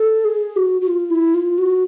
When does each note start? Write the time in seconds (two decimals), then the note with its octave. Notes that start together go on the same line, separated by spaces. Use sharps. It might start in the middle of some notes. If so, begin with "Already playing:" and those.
Already playing: A4
0.25 G#4
0.56 F#4
0.81 F#4
0.87 F4
1.10 E4
1.34 F4
1.58 F#4